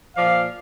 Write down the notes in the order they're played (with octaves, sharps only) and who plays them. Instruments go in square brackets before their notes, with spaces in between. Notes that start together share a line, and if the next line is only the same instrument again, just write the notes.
[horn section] A#2 F3 D5 F5